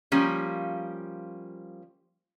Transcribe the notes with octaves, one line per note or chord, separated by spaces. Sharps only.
F3 G3 A#3 C#4